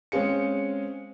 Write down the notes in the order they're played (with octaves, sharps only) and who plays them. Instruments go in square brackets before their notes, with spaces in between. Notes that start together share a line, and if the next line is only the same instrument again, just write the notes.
[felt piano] G#3 C4 C#4 G#4 F5 C#7